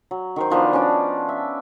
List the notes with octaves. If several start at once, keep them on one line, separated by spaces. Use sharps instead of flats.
F#3
D#3 A#4 C5
D#3 F3 B3 D4
F3 C#4 D4
E5